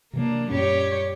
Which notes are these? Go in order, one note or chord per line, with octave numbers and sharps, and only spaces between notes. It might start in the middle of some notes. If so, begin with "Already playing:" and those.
C3 E3 F#3 A#3 D4
F#2 A#2 G3 C#4 G4 C#5